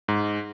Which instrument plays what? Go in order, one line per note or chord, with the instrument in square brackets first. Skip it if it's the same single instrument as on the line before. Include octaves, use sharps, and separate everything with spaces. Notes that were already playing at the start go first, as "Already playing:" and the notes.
[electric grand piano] G#2